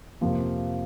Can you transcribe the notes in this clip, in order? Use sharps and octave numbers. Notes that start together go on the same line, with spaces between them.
F2 C3 F3 A#3